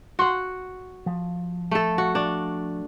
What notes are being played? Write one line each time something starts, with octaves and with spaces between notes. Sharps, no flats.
F#4 F#5 C6
F3
A3 A4
F#4
D4